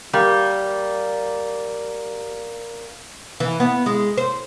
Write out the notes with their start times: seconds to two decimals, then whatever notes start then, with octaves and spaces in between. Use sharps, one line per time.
0.13 G3 A#3
3.40 E3
3.60 B3
3.86 G#3
4.18 C5